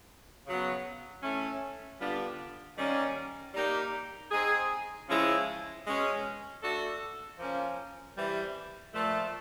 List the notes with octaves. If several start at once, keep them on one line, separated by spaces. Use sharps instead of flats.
C#3 F#3 B3
E3 A3 C#4
D3 G3 B3 D4 F4
D#3 G3 A#3 C#4
G3 A#3 D#4 G4 A#4
C4 D#4 G#4
C#3 F3 G#3 C#4 E4
B2 G#3 C#4
A3 D4 F#4 A4
F3 A#3 C#4
C3 E3 G3
A#2 F3 A3